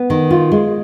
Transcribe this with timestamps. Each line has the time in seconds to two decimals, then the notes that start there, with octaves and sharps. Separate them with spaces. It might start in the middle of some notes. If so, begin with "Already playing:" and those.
Already playing: B3
0.10 D#3
0.31 F4
0.52 G#3